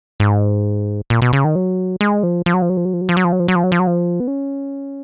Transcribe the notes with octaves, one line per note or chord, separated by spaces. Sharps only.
G#2
A#2
B2
C#3
D#3
F#3
G#3
F3
F3
F#3
F3
F#3
F3
F#3
F3
F#3
F3
F#3
F3
F#3
F3
F#3
F3
F#3
F3
F#3
F3
B3
C#4